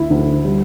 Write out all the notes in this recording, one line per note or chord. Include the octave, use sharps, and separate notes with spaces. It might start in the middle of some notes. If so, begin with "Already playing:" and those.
Already playing: D2 E4
D2
G3